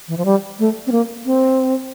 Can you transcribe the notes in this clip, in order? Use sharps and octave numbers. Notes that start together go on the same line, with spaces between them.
E3
F3
G3
A3
C4
A#3
C4